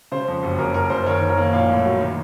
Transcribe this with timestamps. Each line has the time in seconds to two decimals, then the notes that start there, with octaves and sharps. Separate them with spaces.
0.12 C#3 C5
0.28 F2
0.43 F#1
0.58 F#1 A#4 C#5
0.74 F#1 A#4
0.90 F#1 C5
1.06 D#3 A#4 C#5
1.22 D#3
1.30 A#4 C#5
1.37 A#3
1.53 A#1 C#5 F5
1.69 A2
1.85 F#3
2.01 D#3